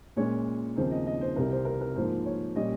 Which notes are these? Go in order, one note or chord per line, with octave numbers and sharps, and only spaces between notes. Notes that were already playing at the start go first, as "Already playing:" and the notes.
A#2 G#3 C#4 C#5
D#2 C#3 F3 C4 D#4 C5
D#5
D#5
C5
C2 C3 G3 A#4
C5
A#4
A#4
G#2 F3 A#3 C5
C#5
A#2 G3 C#4 D#5